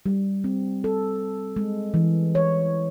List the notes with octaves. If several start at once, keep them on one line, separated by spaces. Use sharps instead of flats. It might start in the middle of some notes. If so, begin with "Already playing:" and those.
G3
C4
A4
G#3
E3
C#5